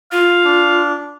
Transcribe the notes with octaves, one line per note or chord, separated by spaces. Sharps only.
F4 F5
D4